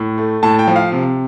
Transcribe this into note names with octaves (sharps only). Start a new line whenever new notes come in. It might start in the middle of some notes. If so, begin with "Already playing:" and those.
Already playing: A2
A3
A2 A5
G5
F3
F5
C3